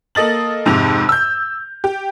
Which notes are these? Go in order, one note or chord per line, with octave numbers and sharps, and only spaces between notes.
A#3 A4 D#5 A6 F#7
F2 G#2 C3 F7
E6 G6
G4